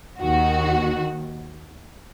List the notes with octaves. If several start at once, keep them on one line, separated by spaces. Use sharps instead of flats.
D#2 D#3 F#4